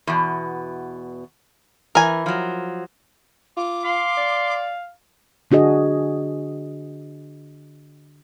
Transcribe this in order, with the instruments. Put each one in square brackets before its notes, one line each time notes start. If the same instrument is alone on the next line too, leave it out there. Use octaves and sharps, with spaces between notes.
[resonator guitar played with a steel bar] E2 B2
[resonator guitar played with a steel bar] E3 [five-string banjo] A#4 G#5
[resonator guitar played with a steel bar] F3 F#3
[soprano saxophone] F4 [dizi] D6
[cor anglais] F5 [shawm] C6
[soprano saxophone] D5
[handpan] D3 D4 F#4 G#4 D#5